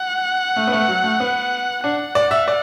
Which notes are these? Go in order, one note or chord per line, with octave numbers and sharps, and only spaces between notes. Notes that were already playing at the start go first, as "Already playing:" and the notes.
Already playing: F#5
A3
B3
A3
F#3
A3
B3
D4 F#5
D5
E5
D5